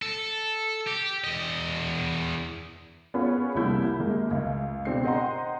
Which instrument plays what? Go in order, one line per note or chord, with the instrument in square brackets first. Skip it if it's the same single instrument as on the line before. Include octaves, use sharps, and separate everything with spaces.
[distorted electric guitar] A4
G4
E2 D#5
[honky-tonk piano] B3 C#4 F4 G#4 B4 C#5
C2 F2 G3 A#3 E4 G6
F#2 G#3 A#3
C#2
B2 C4 D4 C7
C5 D#5 F#5 G5 A#5 C6